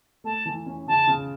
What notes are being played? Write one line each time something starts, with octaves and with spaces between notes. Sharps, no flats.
A3 A5
E3
C#4
C#3 A5
C#3